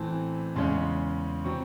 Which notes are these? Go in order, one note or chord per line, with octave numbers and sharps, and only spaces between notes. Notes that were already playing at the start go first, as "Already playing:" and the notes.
Already playing: A1 A2 E3 C4 A5
E2 C#3 G#3 C#4 C6
C3 F#3 C4 C#6